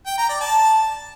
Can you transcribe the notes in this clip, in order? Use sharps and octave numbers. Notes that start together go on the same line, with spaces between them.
G5
A#5
D5
A5